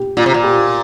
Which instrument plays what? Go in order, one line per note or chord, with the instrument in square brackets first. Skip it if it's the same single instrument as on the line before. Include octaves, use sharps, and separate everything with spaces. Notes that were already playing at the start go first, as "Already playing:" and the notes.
Already playing: [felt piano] G4
[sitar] A#2 [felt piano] F4
[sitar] C3
A#2
[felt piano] G4